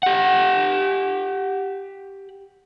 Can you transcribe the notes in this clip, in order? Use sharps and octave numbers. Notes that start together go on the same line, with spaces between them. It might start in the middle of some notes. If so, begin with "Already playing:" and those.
G4 F#5